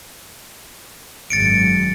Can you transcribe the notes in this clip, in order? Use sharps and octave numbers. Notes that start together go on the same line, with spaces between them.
G#1 F#2 A6 C#7 D7